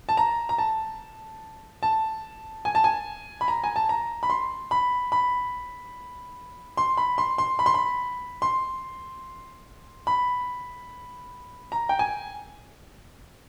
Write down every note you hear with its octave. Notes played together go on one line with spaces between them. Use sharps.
A5
A#5
A#5
A5
A5
G#5
A5
G#5
B5
A#5
G#5
A5
A#5
B5
C6
B5
B5
C6
B5
C6
C6
B5
C6
B5
C6
B5
A#5
G5
G#5